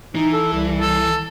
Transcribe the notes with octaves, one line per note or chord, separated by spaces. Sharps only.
E3 D#4
A4
C2
A4